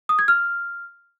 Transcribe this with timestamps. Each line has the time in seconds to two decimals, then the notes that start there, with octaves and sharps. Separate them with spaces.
0.09 D#6
0.19 G#6
0.28 F6